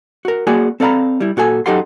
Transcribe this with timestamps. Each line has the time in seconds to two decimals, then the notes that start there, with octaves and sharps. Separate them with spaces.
0.25 F#4 A#4
0.47 A#3 F#4 G#4 D5 G#5
0.80 C4 A4 D5 F5 A#5 B5
1.20 G3 E4
1.37 A#2 F#4 A4 G#5
1.66 F#2 D#4 G4 A4 F#5 C6